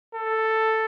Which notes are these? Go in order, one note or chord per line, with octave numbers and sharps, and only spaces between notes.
A4